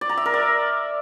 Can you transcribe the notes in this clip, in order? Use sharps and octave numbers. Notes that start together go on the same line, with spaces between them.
D5
A#5
E5
A#4
D5